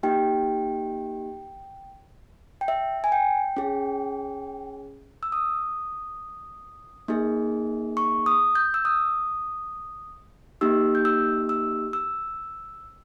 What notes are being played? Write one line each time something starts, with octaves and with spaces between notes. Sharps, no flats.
A#3 D#4 G4 G5
G5
E5
G#5
G5
C#4 G#4
E6
D#6
A#3 D#4 G#4
C#6
D#6
G6
E6
D#6
A#3 D#4 G4 E6
G6
E6
E6
E6